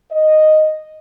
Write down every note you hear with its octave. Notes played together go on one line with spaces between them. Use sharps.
D#5